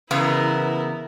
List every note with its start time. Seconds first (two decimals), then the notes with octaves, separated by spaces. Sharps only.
0.11 E2 C#3 B3 E4 A#4